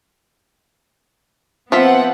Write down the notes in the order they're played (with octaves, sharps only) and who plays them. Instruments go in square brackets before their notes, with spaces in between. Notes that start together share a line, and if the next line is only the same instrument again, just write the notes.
[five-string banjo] F3 F4 E5 [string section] B3 C4 F#5